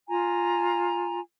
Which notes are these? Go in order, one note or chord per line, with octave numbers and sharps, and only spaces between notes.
F4 G#5 A#5